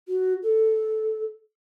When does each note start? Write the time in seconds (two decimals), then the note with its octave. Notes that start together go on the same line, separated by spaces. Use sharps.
0.08 F#4
0.43 A4